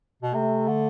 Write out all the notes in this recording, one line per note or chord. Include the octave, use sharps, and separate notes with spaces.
B2
C3 A3
D3